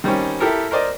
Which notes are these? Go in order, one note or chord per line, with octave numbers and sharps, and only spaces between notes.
D#3 G3 C4 C#4
E4 G4 A4 A#4
A#4 C5 D5 D#5